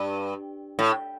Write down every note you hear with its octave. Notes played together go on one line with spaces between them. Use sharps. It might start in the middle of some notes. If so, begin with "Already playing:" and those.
Already playing: G2
A2